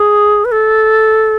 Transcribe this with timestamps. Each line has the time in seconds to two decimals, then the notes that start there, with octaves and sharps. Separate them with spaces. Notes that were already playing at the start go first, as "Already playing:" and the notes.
Already playing: G#4
0.45 B4
0.52 A4